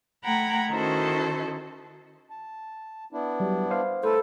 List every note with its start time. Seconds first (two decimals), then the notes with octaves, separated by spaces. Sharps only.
0.25 A3 F#5 G5 A#5 B5 G#6
0.70 D#3 C#4 E4 F#4 A4 C5
2.30 A5
3.13 B3 D4 E4
3.40 F#3 G3
3.71 C5 F5
4.04 A3 E4 A4 B4 C5